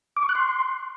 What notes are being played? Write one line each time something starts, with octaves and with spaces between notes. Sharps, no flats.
D6
C#6
F#6
C6